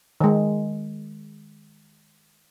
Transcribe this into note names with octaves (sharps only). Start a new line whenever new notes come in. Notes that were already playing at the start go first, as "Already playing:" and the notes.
D#3 G#3